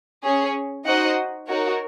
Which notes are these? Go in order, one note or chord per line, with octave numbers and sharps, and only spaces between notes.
C#4 G#4 C#5
D#4 F#4 C5 D#5 F#5
D#4 F#4 A#4 C#5